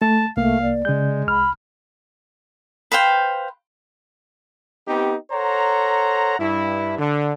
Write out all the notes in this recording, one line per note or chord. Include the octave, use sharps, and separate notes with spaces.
A3 A5
C2 A3 A#3 F5
D5
C#3 G#3 G6
C2 B5 F6
B4 C5 F5 G5
B3 C4 D#4 G4
A4 C5 C#5 F#5 A#5
G2 E4
D3